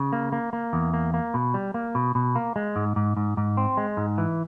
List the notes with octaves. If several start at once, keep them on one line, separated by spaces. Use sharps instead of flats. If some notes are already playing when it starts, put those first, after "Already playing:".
Already playing: C#3
A#3
A#3
A#3
E2
A#3
A#3
B2
G3
A#3
B2
B2
A#3
G#3
G#2
G#2
G#2
G#2
C4
G#3
G#2
E3